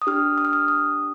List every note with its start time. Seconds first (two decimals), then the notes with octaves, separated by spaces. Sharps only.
0.02 D#6
0.07 D4 G4 F6
0.38 D#6
0.45 F6
0.53 D#6
0.68 D#6